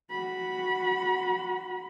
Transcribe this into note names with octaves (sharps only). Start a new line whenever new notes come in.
F#4 B5